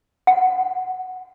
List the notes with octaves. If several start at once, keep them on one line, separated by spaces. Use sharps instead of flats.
F#5